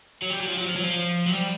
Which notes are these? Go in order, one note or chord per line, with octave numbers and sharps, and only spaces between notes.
F#3
G3
F#3
F3
F#3
F3
F#3
F3
F#3
G3